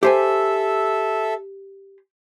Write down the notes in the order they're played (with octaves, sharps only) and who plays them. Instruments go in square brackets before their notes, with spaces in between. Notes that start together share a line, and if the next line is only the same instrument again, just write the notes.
[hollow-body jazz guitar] G4 C5 G#5 [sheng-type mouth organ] A4 E5